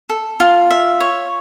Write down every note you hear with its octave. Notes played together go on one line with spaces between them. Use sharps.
A4
F4
E5
C#5